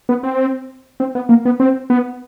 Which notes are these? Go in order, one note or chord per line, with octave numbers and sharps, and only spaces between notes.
B3
C4
C4
B3
A#3
B3
C4
B3